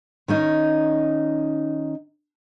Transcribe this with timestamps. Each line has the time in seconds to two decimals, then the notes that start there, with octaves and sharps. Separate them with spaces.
0.28 D#3 C#4 D#4